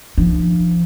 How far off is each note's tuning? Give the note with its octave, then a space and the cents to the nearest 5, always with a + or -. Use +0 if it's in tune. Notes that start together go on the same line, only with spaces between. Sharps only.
F3 -25 D4 +40